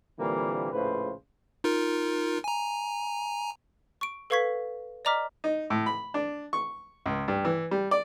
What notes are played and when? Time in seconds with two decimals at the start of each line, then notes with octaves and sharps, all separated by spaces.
0.18 A#2 D3 E3 G3 A#3 C4
0.72 A#1 A2 C#3 B4 C5
1.64 D#4 F4 A#4
2.44 G#5 A#5
4.01 C#6 D7
4.30 A4 B4 F5 C#6 G#6 B6
5.05 D5 D#5 A#5 D6 F6 B6
5.44 D#4
5.70 A2
5.86 B5
6.14 D4
6.53 C#6
7.06 C#2
7.28 G2
7.45 E3
7.71 G3
7.91 D5